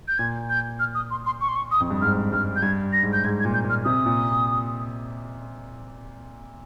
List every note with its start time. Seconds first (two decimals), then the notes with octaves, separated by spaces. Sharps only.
0.08 G6
0.18 A#2 G#6
0.50 G6
0.80 F6
0.95 D#6
1.11 C6
1.26 C6
1.41 C#6
1.49 C6
1.56 C#6
1.71 D#6
1.80 F2
1.91 G2
2.01 G#2 F6
2.32 G2 F6
2.56 G6
2.63 G2 G#6
2.93 A#6
3.03 G#2
3.13 G6
3.24 G#2 G#6
3.39 G#6
3.45 A#2
3.54 G6
3.64 A#2
3.70 F6
3.84 C3 D#6
4.06 A#2